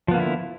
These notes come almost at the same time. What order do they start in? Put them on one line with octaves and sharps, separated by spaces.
F3 B3 A#3 D3 E4